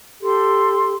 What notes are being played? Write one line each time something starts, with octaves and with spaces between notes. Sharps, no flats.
G4 A4 C6